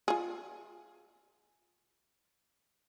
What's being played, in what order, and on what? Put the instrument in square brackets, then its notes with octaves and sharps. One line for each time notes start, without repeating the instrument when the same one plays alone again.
[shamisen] F4 G#4